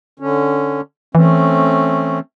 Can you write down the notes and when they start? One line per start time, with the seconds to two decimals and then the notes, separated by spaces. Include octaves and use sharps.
0.19 D3 C#4
1.15 E3 A3 C4 C#4